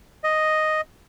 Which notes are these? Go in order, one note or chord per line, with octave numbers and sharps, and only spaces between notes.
D#5